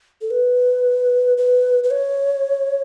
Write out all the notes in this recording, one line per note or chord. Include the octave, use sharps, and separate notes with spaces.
A4
B4
B4
B4
C#5